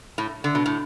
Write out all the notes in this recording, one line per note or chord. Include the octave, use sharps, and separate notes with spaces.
A2
D3
B2
A2